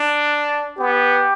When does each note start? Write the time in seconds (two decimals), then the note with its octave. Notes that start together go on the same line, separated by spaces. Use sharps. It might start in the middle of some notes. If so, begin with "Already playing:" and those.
Already playing: D4
0.79 B3 G4